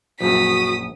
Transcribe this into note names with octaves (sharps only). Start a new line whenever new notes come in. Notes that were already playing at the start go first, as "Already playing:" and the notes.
A#1 F#2 F#4 D#6 B6